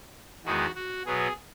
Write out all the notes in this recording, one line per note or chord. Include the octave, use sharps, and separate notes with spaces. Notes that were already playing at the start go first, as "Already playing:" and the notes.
E2 D#3 G#3 B3 F#4
F#4
B2 F#3 B3 G#4